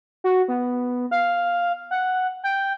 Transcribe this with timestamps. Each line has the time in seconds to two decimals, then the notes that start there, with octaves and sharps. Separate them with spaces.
0.24 F#4
0.48 B3
1.11 F5
1.91 F#5
2.44 G5